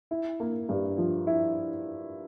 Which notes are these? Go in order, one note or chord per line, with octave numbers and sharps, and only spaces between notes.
E4
A#3
G2
F3
E4